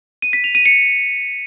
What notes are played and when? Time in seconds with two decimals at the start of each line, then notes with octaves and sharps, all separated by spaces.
0.22 D#7
0.33 B6
0.44 F7
0.55 D#7
0.66 C#7